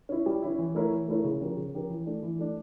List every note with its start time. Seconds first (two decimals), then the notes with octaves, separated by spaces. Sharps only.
0.09 C#4 E4
0.26 G3
0.42 C#4 E4
0.58 E3
0.75 A3 E4 A#4 C#5
0.91 E3
1.08 A3 E4 A#4 C#5
1.24 C#3
1.41 F3 C#4 G4 A#4
1.57 C#3
1.74 F3 C#4 G4 A#4
1.90 E3
2.06 A3 D4
2.23 E3
2.39 A3 D4